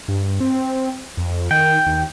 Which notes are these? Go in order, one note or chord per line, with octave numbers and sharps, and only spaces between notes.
G2
C4
F2
D#3 G5
D#2